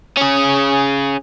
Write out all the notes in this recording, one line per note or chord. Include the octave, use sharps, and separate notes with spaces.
C#4 G#4